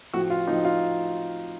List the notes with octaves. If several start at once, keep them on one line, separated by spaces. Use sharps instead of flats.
A2 F3 C4 F#4
F4
A2 F3 C4 D#4
F4